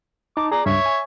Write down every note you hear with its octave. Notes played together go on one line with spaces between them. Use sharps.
D#4 A5 A#5 D6
G#4 D5 A#5
C#2 G2 C#5 E5
G#5